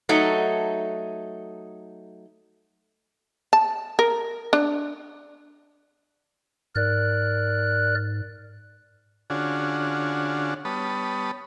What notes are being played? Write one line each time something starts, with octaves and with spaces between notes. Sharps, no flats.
F#3 A3 D#4
A5
A#4
D4
G#2 A#4 D5 F#6
D3 C#4 D4 F4 F#4 G#4
G3 B3 C#5 A5 B5 D#6